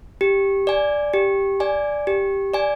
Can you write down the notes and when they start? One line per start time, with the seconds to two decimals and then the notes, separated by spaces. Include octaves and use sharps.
0.21 G4
0.67 D5 G#5
1.13 G4
1.60 D5 G#5
2.07 G4
2.54 D5 G#5